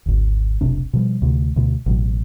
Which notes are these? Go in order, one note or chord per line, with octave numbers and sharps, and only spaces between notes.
G#1 D2
F1 B1 C3 D4
B2 F3 G3
D2 C3
D2 B2
A1 B2 F#3